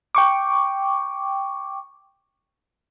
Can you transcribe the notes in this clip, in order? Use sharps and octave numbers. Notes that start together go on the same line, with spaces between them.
G5 C#6 D6